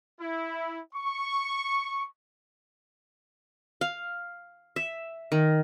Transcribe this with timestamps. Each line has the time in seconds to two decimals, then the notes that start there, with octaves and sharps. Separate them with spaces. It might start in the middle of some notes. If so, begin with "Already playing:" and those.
0.19 E4
0.95 C#6
3.81 F5
4.76 E5
5.32 D#3